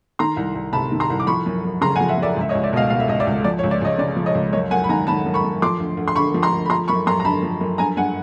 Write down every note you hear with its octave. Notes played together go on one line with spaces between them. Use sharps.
D#3 A#5 C6
C2
C2
C3 A5 B5
D#3
A#5 C6
C2
D6
F3 B5 C#6
F#2
F#2
C#3 A#5 C6
F#5 G#5
F3
E5 F#5
F#2
D5 E5
C#2 E5
C#5 D#5
C#2
D5 E5
B2 D#5 F5
B2 F5
E5
C#2 D#5
D5 E5
C#2
F3 D5
C#5
C#2
D5
C#2 C#5 D#5
C#3 D5
F3
C#5 D#5
C#2
F#2 C#5 D#5
F#2 F#5 G#5
B5
D#3 G#5 A#5
D#3 A5 B5
F#2
B5 C#6
F#2
F3 C6 D6
D2
D2
C6
D3 B5 C#6
F3
A#5 C6
D2
B5
F3 A#5 C6
F#2 B5 C#6
F#2 A#5 C6
A#5
D3 A5 B5
F3
F#2
G2 G#5 A#5
G2 F#5 G#5